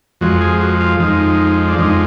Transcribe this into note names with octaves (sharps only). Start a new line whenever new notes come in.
F2 F3 G#3 F#4
G#4
F#4
F4
F2 F3 G#3 D#4
D4
F2 F3 G#3 D#4